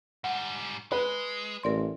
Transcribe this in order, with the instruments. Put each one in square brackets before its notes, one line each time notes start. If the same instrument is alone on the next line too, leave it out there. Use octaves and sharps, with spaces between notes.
[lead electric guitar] G#2 G3 [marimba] F#5
[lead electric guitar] G#3 [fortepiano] B4
[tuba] A1 [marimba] A#4 D5 C6